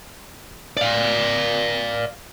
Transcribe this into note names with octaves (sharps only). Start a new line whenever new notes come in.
D5 F5